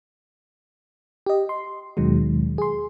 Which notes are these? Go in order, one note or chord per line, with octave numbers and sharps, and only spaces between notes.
G4 D#5
C6
D#2 B2 D#3 F#3 G#3
G#4 C6